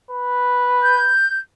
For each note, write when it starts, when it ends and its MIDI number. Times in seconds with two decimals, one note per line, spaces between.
0.11 1.11 71
0.82 1.38 91